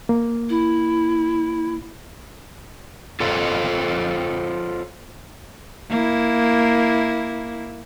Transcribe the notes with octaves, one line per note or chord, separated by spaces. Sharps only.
A#3
E4
F4 A4 C5 C#5 F5
A#3 E4